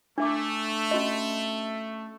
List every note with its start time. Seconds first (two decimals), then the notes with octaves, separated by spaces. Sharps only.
0.18 A3 D4 E5 D6
0.91 C#4 F#4 D#5